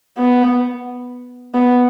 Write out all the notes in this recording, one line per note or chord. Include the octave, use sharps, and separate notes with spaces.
B3
B3